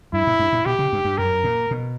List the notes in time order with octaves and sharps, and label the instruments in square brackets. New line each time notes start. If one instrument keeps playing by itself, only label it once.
[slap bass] G2 [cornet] E4
[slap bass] A#2
G2
A#2
[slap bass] B2 [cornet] G4
[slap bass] C#3
G2
G2
[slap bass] F#2 [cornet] A#4
[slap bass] A#2
B2